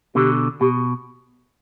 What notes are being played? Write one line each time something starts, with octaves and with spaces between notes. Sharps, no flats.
B2 D3 G4
B2 G4